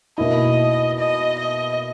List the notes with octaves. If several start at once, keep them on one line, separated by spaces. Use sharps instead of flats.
B2 A#3 E4 D#5
D#5
D#5